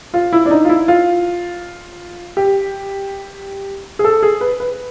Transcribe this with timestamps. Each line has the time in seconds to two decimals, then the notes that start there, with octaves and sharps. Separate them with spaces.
0.14 F4
0.33 E4
0.46 D4
0.51 D#4
0.65 F4
0.69 E4
0.88 F4
2.37 G4
3.99 G#4
4.04 A4
4.23 G#4
4.41 B4
4.60 B4